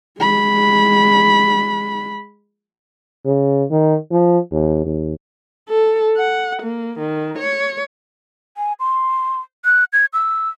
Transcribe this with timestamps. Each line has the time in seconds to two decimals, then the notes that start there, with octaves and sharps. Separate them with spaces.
0.20 G#3 B5
3.25 C#3
3.71 D#3
4.11 F3
4.51 D#2
4.85 D#2
5.69 A4
6.16 F#5
6.62 A#3
6.99 D#3
7.39 C#5
8.57 G#5
8.80 C6
9.65 F#6
9.93 G#6
10.13 E6